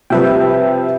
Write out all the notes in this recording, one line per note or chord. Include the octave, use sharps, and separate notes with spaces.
C3 F3 G3 B4 E5 G5